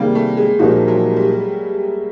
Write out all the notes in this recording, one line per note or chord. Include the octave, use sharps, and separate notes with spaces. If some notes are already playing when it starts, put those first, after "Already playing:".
Already playing: C3 D#3 G3 G#3 A#3
A3
G#3
A#2 F3 G3 A#3 D#4 F#4
F#3
G3